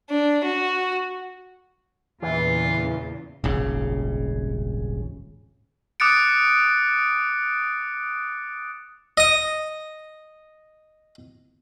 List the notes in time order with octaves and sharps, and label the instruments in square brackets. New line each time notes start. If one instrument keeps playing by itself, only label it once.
[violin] D4
F#4
[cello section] E2 A#2 C#3 [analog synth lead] E3 [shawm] F4
[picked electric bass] D#1 G#1 C#3
[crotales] D6 D#6 F#6 A6 C#7 D7
[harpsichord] D#5 D#6